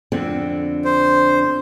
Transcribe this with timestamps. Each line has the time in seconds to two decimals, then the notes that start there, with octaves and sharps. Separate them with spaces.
0.12 F2 D3 C4
0.85 C5